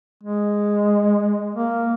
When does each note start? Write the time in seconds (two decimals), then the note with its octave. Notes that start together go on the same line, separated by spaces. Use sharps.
0.23 G#3
1.55 A#3